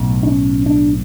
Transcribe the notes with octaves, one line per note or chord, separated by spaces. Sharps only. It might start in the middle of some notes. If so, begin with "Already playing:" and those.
Already playing: B1 A2
D4
C#4
D4